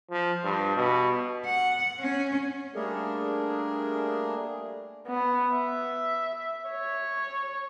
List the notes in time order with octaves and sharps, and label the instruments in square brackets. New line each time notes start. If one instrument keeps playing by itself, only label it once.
[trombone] F3
G2
B2
[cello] F#5
C#4
[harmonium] G3 A3 A#3 D4 G#4 A#4
[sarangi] B3
E5
C#5